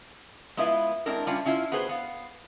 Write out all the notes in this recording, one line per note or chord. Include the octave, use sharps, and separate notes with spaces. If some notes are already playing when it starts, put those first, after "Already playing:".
G#3 B3 E4 F4 B4 E5
G#3 C4 D4 E4 A#4
G3 C#4 D4 F4
C#4 E4 F4
B3 F#4 G#4 B4 C5
B3 F5